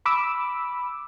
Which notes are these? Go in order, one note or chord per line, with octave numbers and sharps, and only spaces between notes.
B5 D6 E6